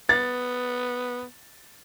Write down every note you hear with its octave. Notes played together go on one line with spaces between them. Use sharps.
B3 A6